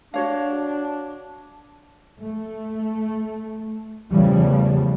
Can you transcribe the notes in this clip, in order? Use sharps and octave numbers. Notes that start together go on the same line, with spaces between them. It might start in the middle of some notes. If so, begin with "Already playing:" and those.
D4 F#4 C#5 F5
A3
E2 C#3 E3 F3 G3 A3